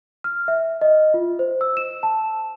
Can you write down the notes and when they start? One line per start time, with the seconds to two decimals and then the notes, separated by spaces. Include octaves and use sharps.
0.24 F6
0.48 E5
0.81 D#5
1.14 F4
1.39 C5
1.61 E6
1.77 E7
2.03 A5